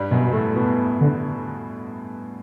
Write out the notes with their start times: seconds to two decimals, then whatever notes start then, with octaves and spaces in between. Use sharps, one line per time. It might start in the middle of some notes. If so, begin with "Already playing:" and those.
Already playing: G2 G3
0.11 F#2 B2 F#3
0.33 A2 A3
0.56 B2 B3
1.01 D3